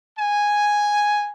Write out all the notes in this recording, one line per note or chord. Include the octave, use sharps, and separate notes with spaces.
G#5